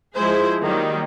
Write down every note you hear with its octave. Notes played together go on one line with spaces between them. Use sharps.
F3 G#3 E4 G#4 C5
D#3 F#3 G3 A#3 D#4